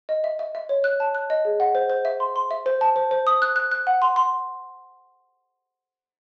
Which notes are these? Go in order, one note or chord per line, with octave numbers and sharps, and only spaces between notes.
D#5
E5
E5
E5
C#5
F#6
A5
F#6
D#5
G#4
F#5
C5
C5
E5
C6
C6
E5
C5
A5
C5
C5
D#6
F#6
F#6
F#6
F#5
C6
C6